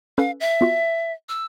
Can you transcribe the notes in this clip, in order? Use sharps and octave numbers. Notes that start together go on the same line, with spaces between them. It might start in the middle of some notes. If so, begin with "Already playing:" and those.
C#4 A4 B4 F5
E5
B3 F4 F#4
E6